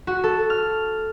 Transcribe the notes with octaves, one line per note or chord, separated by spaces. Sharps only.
F#4
A4
F6